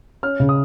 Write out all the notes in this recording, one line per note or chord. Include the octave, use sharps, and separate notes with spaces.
C#4 F6
C#3
D#6